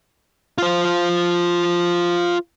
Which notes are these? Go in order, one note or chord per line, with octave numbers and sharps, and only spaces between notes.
F4 C5